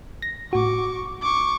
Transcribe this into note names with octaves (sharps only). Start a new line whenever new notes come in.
A#6
A2 F#4 C#6 D6
C#6 D6